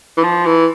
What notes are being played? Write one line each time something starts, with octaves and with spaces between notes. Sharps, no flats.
E3
F3
E3